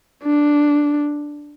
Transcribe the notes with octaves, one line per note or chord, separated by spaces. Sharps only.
D4